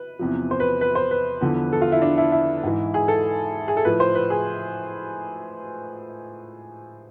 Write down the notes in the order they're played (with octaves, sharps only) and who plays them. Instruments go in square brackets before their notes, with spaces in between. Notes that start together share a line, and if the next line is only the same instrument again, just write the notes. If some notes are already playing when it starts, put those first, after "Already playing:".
Already playing: [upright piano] B4
E2 C3 F3
C5
B4
B4
C5
B4
E2 D3 F3
A4
F4
E4
D4
E4
E4
G#2 E3
G#4
A4
G#4
A4
A2 F3 B4
C5
B4
G#4